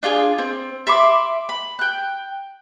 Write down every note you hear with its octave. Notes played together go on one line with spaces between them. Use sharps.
D4 F4 G4 G#4
C4
E5 B5 C6 D6
B5
G5 F#6